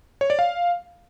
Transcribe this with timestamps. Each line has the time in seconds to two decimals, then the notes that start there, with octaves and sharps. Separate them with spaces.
0.21 C#5
0.30 D5
0.39 F5